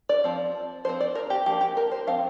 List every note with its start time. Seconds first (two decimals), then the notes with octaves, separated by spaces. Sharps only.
0.09 D5
0.24 F3 C4
0.85 F3 C4 C5
1.00 D5
1.15 A#4
1.30 G4
1.46 F3 A#3 D4 G4
1.61 G4
1.77 A#4
1.92 C5
2.07 F3 C4 F5